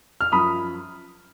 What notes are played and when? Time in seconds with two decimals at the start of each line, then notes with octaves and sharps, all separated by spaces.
0.21 F6
0.32 F#2 F3 B5 D#6